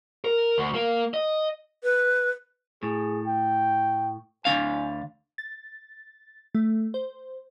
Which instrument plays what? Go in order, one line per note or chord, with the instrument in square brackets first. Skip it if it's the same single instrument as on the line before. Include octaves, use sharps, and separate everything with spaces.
[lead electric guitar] A#4
D2
A#3
D#5
[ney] B4
[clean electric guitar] A2 [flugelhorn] G#4
[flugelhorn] G5
[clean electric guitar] D2 D4 F5 [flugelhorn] G#5
[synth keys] A6
A3
C5